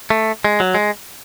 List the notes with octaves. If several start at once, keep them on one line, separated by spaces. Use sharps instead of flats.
A3
G#3
F#3
G#3